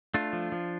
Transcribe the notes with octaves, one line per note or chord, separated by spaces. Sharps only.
A3 D4 F4
F3
F3